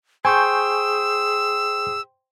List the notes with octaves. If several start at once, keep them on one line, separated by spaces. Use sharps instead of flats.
G#4 C5 G5 G#5 C6 C#6 E6 G6